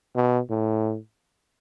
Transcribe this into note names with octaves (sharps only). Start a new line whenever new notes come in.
B2
A2